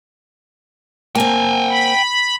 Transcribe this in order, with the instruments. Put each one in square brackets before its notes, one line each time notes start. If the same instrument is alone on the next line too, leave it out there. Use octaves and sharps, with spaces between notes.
[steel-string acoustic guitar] A#3 C4 [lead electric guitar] G5 G#5
[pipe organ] B5